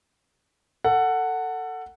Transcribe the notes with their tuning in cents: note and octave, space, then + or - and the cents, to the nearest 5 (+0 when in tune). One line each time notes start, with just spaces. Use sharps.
A4 +25 F#5 +0